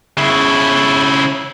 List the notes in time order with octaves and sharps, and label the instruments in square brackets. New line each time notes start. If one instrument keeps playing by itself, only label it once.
[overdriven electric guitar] C#3 E4